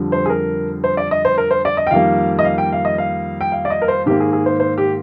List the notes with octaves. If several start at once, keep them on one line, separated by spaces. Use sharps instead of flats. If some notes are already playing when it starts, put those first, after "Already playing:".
Already playing: F2 D3 G3
C5
G#4
A#4
C5
D5
D#5
C5
A#4
C5
D5
D#5
G5
F2 D#3 G3 A#3 F5
D#5
F5
G5
F5
D#5
F5
G5
F5
D5
D#5
A#4
C5
G#2 D#3 A#3 G4
G#4
G#4
C5
C5
G4